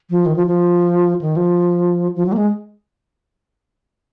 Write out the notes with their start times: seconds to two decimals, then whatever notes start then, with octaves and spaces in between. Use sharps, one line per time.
0.10 F3
0.26 D#3
0.36 F3
0.47 F3
1.21 D#3
1.36 F3
2.16 F3
2.26 F#3
2.32 A#3
2.37 G#3